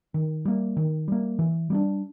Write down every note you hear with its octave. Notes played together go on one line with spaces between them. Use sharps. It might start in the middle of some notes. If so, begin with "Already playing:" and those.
D#3
G3 A#3
D#3
G3 A#3
E3
G3 A#3 D4